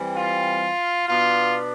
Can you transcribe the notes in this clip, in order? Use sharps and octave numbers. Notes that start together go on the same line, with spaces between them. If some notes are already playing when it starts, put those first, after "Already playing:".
Already playing: E3 G3 C4
F4
B2 B3 D4 F4